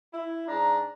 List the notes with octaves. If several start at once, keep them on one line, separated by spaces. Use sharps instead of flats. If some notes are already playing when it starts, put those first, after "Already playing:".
E4
G#2 D4 A#5